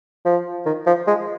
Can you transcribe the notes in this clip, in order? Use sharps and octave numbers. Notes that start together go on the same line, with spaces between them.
F3
D#3
F3
G#3